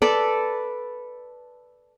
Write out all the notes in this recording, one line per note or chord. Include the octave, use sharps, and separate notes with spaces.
A4 B4 D5